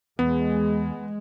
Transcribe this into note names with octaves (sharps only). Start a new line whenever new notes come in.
E2 G#3 B3